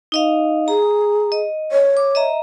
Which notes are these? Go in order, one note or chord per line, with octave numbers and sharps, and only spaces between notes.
D#4 D#5 F5
G#4 A#5
D#5
C#5
D6
D#5 E5 A#5